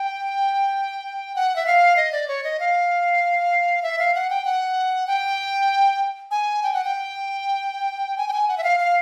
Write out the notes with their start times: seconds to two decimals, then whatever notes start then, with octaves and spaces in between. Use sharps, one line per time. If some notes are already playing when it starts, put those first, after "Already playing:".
Already playing: G5
1.35 F#5
1.56 E5
1.67 F5
1.96 D#5
2.12 D5
2.28 C#5
2.44 D#5
2.60 F5
3.83 E5
3.99 F5
4.15 F#5
4.30 G5
4.45 F#5
5.07 G5
6.31 G#5
6.63 G5
6.74 F#5
6.85 G5
8.18 G#5
8.28 G5
8.33 G#5
8.48 F#5
8.58 E5
8.64 F5
8.80 F5